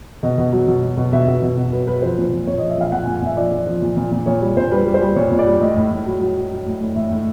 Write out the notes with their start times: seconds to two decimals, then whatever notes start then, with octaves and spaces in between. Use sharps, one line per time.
0.23 B2 D#5
0.38 B2
0.52 F#3
0.67 B2
0.82 F#3
0.97 B2
1.13 B2 E5
1.28 B2
1.42 B2
1.57 B2
1.72 F#3 B4
1.87 F#3 B4
2.02 F3 C5
2.18 A#2
2.33 A#2
2.47 A#2 C#5
2.58 F3 D#5
2.69 E5
2.77 A#2 F5
2.92 A#2 F#5
3.03 G#5
3.07 A#2
3.15 G#5
3.22 A#2 E5
3.37 F3 D5
3.52 F3
3.67 F3
3.82 A#2
3.97 A#2
4.11 A#2
4.26 A#2 C#5
4.42 G3
4.57 A#2 C5
4.72 G3 B4
4.86 G3
4.94 C5
5.02 G3
5.16 A#2 C#5
5.31 A#2
5.39 D5
5.47 G3
5.61 A2 D#5
5.76 A2
5.91 A2
6.06 F#3
6.21 F#3
6.36 F#3
6.51 F#3
6.66 A2
6.81 A2
6.96 A2 E5
7.11 A2